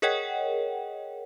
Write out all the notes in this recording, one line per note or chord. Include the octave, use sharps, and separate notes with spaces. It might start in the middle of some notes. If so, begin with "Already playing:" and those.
G#4 A#4 C#5 D#5 F#5 G5